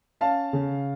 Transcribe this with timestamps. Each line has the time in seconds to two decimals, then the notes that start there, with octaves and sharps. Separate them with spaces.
0.21 C#4 F5 A5
0.53 C#3